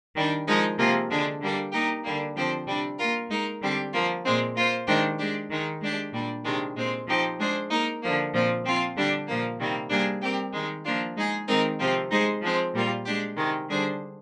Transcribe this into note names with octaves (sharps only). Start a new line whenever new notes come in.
D#3 G3 D4
F3 G#3 D#4 A#4
C3 F3 A#3 F4 G#4
D3 G#3 D4
D3 G3 A#3 D4
A#3 D#4 G4 A#4
D3 G3 A#3
D3 F3 C4 G4 C5
C3 G3 D4
A#3 F4 A#4
G#3 D#4 A#4
D3 G3 C4 G4
F3 A#3 F4
A#2 G#3 C4
A#3 F4 C5
D#3 G#3 D4 G4 C5
G#3 D4 G4
D#3 G#3 D#4
G#3 D4 G4
A#2 G3 D4
C3 D#3 G#3 D4
A#2 G#3 C4
F3 C4 D#4 G4 C5
G#3 D4 G#4 C5
A#3 D#4 A#4
D3 F3 A#3
A#2 F3 C4
F3 C4 F4
D3 G3 D4 G4
A#2 F3 A#3
C3 D#3 G3 A#3
C3 G3 A#3 D4 G#4
G3 C4 G4 A#4
D#3 G#3 D#4
F3 A#3 D4 F4
G#3 D#4 G#4
D#3 G#3 C4 D#4 A#4
C3 F3 C4 F4
G#3 D#4 G#4 C5
F3 G#3 C4
A#2 G3 A#3 F4
G#3 D4 G4
C3 D#3 G#3
D3 G3 D4 G#4 C5